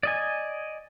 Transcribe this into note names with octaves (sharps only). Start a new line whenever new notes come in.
D5 D#5 G#5